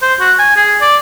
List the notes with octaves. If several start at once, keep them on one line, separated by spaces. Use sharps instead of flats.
C5
F#4
G#5
G#4
D5